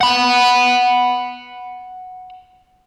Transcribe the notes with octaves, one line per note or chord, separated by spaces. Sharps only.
F#5 B5